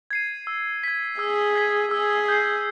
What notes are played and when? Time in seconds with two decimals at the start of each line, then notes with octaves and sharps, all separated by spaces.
0.11 G#6 C7 D#7
0.47 E6
0.83 G#6 B6
1.19 G#4 E6
1.56 G#6 B6
1.91 G#4 E6
2.29 G6 C7